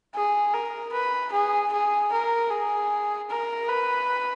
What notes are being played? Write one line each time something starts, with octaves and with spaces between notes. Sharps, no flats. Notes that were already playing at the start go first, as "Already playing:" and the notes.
G#4
A#4
B4
G#4
G#4
A#4
G#4
A#4
B4